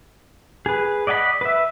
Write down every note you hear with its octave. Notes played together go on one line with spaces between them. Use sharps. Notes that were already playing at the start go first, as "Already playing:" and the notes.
G#4 B4
D5 D#5 F#5 G#5 B5
B4 E5